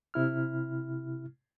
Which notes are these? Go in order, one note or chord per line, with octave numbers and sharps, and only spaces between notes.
C3 E4 F6